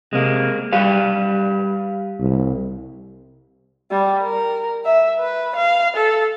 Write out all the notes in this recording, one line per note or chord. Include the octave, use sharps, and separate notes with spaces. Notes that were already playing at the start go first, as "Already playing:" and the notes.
C3 G#3 A#3
G3 G4 B4 F5
C2
G3
A#4
E5
B4
F5
A4